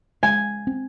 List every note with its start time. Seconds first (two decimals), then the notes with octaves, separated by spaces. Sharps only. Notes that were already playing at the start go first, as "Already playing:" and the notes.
0.23 G#3 G#5
0.67 C4